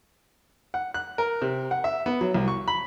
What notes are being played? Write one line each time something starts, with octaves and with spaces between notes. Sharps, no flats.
F#5
F#6
A#4
C3
F#5
E5
B3
F#3
C2
C#6
B5